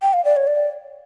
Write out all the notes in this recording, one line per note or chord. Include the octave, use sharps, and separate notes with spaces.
G5
F5
D5
C#5
D5